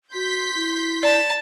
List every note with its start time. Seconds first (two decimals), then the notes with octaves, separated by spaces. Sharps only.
0.14 F#4 C6 G6 B6
0.55 E4
1.03 D5 A5